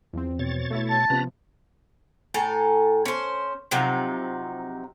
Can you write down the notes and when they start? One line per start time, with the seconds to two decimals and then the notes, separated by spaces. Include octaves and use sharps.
0.13 E2 F3 C4
0.39 B2 C#5 A6
0.71 A3 E4 E5
0.90 A5
1.10 C3 F3 B3 C#4 B4 A#5
2.34 A2 A4 G#5 A#5
3.05 C#4 C5
3.71 C3 F3 F#3 D#4